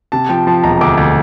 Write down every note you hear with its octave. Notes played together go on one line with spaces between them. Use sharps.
C3 A5
F3 G5
F3 A5
E1 A#5
D2 D6
D2